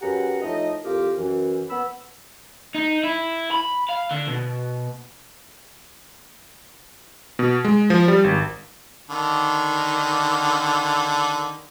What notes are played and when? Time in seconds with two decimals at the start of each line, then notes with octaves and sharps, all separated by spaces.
0.01 F#2 G4 G#4 B4 F#5 A#5
0.41 A2 F3 A3 D#4 D#5
0.84 C2 F2 F4 G4 A#4
1.17 F#2 E3
1.70 B3 B5 E6
2.75 D#4
3.03 E4
3.52 B5
3.89 F5
4.11 D3
4.28 B2
7.39 B2
7.65 G#3
7.90 F3
8.08 G3
8.24 G#1
9.10 D3 D#3